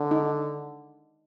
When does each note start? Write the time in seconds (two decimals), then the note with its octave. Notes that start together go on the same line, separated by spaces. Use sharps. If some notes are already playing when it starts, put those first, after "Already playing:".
Already playing: D3
0.11 D#4